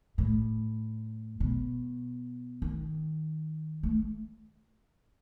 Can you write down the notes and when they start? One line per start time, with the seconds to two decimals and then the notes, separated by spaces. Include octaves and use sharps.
0.18 A2
1.40 B2
2.62 D#3
3.83 A3